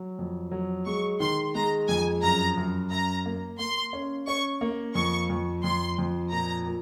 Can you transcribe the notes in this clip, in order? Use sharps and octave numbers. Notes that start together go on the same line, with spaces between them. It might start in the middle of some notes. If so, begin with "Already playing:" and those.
Already playing: F#3
F2
F#3
G#3 C#6
D#3 C6
G#3 A#5
F2 G#5
F#2 A#5
F#2
F#2 A#5
A#3
A#3 C6
C#4
C#4 C#6
A#3
F2 C#6
F2
F2 C6
F2
A#2 A#5
A#2